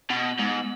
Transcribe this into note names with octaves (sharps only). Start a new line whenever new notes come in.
B2 B3
G#2